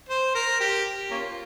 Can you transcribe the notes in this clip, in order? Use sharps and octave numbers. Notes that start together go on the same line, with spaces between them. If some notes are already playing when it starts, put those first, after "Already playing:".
C5
A#4
G4
A#3 C#4 F4